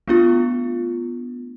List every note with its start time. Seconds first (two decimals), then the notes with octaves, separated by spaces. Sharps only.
0.08 A3 B3 D4 F4